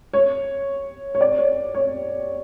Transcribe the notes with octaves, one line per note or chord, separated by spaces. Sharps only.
C#5
C#5
D5
C#5
C#5